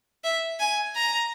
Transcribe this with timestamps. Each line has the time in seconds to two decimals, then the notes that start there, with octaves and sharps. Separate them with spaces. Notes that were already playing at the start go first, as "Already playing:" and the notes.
0.24 E5
0.60 G#5
0.96 A#5